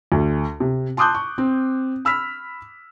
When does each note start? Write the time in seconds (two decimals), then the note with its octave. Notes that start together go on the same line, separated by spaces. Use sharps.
0.12 D2
0.60 C3
0.97 A5 C6 D6 D#6 F#6 G6
1.15 C#6
1.38 C4
2.05 B5 E6 F6 B6